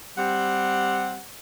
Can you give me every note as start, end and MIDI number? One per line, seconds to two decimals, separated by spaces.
0.17 1.20 55
0.17 1.20 60
0.17 1.20 67
0.17 1.20 78